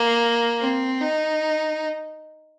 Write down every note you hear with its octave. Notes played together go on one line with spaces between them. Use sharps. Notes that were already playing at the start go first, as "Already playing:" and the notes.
Already playing: A#3
C4
D#4